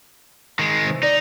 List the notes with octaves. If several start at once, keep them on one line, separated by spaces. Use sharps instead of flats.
D#3 G#3
C3 E3
D#4 D5